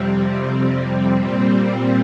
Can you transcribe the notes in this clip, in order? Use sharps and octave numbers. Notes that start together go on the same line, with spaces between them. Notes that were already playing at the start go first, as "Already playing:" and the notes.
Already playing: F2 C3 G3 C4
A#2 G3 C4